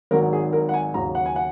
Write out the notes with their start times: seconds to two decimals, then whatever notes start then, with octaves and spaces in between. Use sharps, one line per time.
0.11 G#1 G#2 D#3 F#3 A#4
0.33 G#4
0.53 A#4
0.69 F#5
0.74 G#5
0.94 D#2 C#3 F#3 A#5
1.15 F#5
1.26 G#5
1.36 F#5